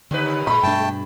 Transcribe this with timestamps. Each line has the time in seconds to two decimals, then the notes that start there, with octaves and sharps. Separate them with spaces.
0.11 D#2 D3 D#4 B4
0.47 A#2 G#3 B5
0.63 G2 B2 A3 D4 G5 A5